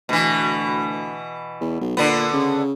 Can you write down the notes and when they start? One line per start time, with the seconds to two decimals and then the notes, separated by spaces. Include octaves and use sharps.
0.09 D2 B2 E3
1.61 E2
1.81 B1
1.97 A#2 D3 B3
2.33 C#3